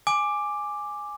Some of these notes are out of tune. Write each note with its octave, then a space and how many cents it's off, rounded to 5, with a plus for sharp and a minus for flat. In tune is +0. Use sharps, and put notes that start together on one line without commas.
G#5 +0 D6 +5